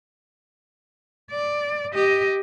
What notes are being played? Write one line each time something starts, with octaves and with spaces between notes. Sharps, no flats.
D5
G4 D#5